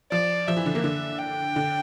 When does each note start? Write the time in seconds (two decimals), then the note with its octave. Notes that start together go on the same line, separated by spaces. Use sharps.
0.12 F3 D5
0.48 F3 E5
0.57 E3
0.66 D3
0.75 A#3
0.84 D3
1.20 G5
1.56 D3